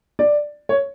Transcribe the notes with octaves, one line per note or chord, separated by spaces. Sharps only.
D5
C#5